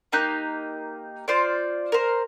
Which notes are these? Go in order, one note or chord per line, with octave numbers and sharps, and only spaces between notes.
A#3 D#4 G4 F#6
F4 C5 D5
A#4 C5